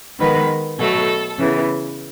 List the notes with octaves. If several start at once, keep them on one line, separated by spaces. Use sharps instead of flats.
D#3 G#3 B3 B4
B2 F#3 A3 A4
C#3 E3 B3